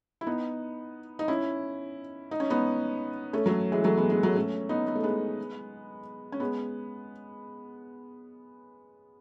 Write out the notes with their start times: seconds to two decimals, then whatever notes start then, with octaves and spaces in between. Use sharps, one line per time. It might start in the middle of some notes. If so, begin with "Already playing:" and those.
0.21 E4
0.27 B3 D#4
1.19 D#4
1.28 C#4 E4
2.31 D#4
2.40 C#4
2.50 B3 D#4
3.33 A3 C#4
3.46 F#3 A3
3.72 E3 G#3
3.84 F#3 A3
3.97 G#3 B3
4.10 G#3 B3
4.23 F#3 A3
4.36 A3 C#4
4.69 B3 D#4
4.87 B3
4.95 A3
5.03 G#3 B3
6.32 C#4
6.40 G#3 B3